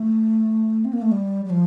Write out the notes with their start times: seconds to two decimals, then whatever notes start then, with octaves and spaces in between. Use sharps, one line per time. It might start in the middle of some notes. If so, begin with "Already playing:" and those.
Already playing: A3
0.85 C4
0.93 A#3
1.02 A3
1.12 G3
1.45 G3
1.50 F3